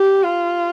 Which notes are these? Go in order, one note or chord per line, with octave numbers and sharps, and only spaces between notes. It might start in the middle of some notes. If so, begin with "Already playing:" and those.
Already playing: G4
F4